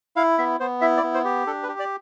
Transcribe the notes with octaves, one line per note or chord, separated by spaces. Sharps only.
E4 F5
B3 E5
B3 C5
E4 E5
D5
B3
C5
G4
D4 A4
B4
G4
D5